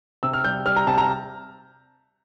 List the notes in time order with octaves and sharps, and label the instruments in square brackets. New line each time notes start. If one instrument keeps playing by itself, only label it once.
[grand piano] C3 E6
F6
G3 G6
G3 F6
A#5
C3 A5
A#5